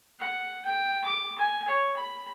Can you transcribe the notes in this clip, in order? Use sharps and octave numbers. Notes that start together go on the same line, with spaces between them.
F#5
G5
D6
G#5
C#5
B5